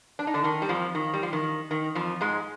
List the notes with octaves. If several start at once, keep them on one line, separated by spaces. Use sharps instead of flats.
D4
D#4
D3 D4
D#3 D#4
G3
F2 F3
D#3
G3
F3
D#3
D#3
F2 F3
G#2 G#3